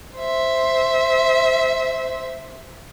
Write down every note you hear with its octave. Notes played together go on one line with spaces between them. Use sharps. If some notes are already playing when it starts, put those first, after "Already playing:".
C5 E5